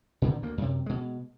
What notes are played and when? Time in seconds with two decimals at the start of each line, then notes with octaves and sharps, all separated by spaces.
0.22 A#2 D3 D#3
0.42 D2 A#3
0.58 F#2 C3
0.86 B2 G#3